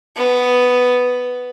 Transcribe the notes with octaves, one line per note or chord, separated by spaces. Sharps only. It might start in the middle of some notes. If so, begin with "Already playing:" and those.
B3